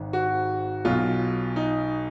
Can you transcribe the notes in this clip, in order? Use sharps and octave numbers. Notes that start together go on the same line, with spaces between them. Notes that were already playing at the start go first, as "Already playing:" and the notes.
Already playing: G#1 G#2 D#3
F#4
B1 B2 F#3 F4
D#4